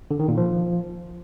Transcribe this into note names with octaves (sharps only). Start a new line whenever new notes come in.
D3
D#3
A#2
F3